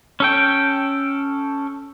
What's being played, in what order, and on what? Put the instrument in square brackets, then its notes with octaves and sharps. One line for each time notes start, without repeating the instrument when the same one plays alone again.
[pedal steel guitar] C#4 A4 G5